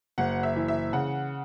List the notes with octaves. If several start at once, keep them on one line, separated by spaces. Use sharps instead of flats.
F#1 F#5
E5
E3
E5
C#3 F#5